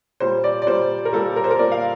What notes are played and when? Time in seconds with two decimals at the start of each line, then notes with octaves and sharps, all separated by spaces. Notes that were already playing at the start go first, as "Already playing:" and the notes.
0.20 A#2 G3 A#3 C5
0.44 D5
0.62 D5
0.67 A#2 G3 A#3 C5
1.05 A#4
1.12 A#2 G3 A#3 A4
1.36 A#4
1.44 C5
1.51 A#4
1.59 A#2 G3 A#3 D5
1.72 F5